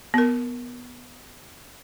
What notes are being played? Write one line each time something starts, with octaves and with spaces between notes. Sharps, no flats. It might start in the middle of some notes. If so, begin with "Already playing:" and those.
B3 A#4